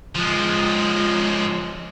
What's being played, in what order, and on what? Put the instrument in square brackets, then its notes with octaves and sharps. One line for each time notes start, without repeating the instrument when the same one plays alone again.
[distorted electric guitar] F3 G#3